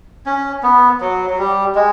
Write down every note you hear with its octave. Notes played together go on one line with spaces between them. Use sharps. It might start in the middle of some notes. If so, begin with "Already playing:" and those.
C#4
B3
F#3
F#3
G3
G#3